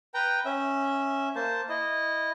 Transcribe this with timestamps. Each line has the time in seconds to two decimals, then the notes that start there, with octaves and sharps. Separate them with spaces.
0.14 B4 G5 A#5
0.45 C#4 E5
1.35 A#3 C5 A5
1.69 E4 D#5